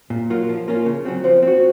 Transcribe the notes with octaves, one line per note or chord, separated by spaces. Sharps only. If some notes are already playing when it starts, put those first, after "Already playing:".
A#2
F#3 A#3 F4
F3
A#3 C#4 F4
C#3
F#3 C4
F3 C5
C4 F#4